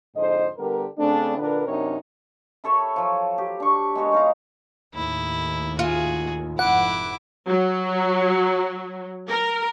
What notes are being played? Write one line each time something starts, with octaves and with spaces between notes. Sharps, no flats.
F2 G#2 D3 C5 D#5
D3 G3 B3 G4 A#4
C#3 A3 C4 D4
A#2 D3 D4 A#4 B4
F#2 C3 D4 D#4 A#4 C#5
E4 A4 C#5 E5
F3 F#3
G4
D4 C#6
G#3 B3 F#4 C#5
D#4 F5 A#5
D#2 A2 E4
F4 F#4 G#4
F1 G#2 F3 E4 F#5 D6
F#3
A#4